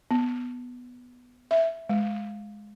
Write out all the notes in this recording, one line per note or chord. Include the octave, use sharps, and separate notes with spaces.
B3
E5
G#3